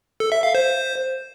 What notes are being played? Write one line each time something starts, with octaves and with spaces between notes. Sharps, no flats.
A4
E5
F5
C5